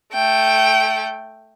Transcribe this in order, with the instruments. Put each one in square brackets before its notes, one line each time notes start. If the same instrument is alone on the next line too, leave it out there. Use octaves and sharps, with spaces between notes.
[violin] A3 G5